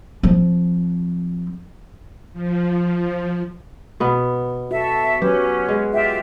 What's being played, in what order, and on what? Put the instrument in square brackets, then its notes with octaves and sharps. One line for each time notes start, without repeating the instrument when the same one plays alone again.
[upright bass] F3 C4
[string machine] F3
[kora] B2 B3
[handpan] F#4 [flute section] A4 E5
[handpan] F#3 B4 [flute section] C#4 [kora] G4
[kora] G#3
[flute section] F4 G4 E5